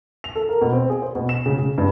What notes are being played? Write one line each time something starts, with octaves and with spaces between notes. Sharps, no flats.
F7
A4
A#4
B2
C4
G#4
C5
B2
E7
C#3
C#3
G2